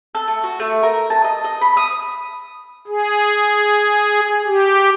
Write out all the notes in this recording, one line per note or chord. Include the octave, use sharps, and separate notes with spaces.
A4
A3
F#4
A3
A#4
A5
D#5
D#5
B5
D#6
G#4
G4